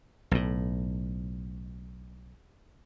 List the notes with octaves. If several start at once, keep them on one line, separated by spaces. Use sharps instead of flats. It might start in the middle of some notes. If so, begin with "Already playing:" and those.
B1 A2